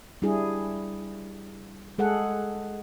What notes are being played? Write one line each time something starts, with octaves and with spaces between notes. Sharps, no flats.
G3 D4 E4 G#4
G#3 G#4 A4 F#5